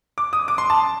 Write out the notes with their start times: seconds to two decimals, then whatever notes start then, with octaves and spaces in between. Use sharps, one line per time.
0.18 D6
0.33 D#6
0.48 D6
0.58 C6
0.70 A5